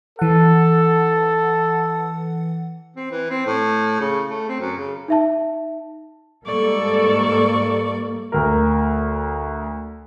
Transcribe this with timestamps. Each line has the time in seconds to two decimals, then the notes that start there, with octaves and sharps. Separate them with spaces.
0.19 E3 A4 F#5
2.97 C4
3.11 E3
3.30 C4
3.46 A2
4.00 C#3
4.30 A3
4.49 C4
4.60 F#2
4.78 C#3
5.08 D#4 E5 A5
6.46 G#2 G3 A#3 A4 D5 C#6
8.32 D2 A#4